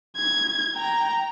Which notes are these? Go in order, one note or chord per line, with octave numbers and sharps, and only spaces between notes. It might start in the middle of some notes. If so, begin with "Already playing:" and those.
G#6
G5 A#5